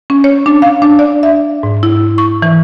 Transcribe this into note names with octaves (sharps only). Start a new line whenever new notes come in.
C#4
C#5
D4
F5
D4
D5
E5
G#2
E4
C#6
E3